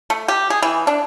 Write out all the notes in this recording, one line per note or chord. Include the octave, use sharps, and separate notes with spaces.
A3
G4
G#4
E3
D4